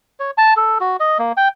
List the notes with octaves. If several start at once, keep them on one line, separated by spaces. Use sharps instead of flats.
C#5
A5
A4
F#4
D#5
A#3
G5